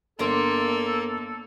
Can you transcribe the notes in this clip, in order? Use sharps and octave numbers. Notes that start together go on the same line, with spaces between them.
G1 A#3 D4 A4 A#4 D5 C6